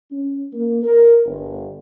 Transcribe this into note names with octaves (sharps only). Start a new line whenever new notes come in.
C#4
A#3
A#4
G1